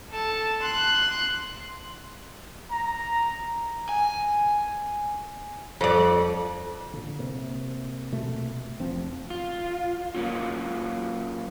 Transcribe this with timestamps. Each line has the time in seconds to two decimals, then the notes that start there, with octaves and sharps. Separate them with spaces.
0.11 A4 A5
0.62 C6 F#6
2.71 A#5
3.89 G#5
5.81 F2 D5
6.93 A#2 D3
7.19 C3 A#3
8.12 B2 A3
8.80 F1 F3 C4
9.30 F4
10.14 F#3 A#3 C#4 F4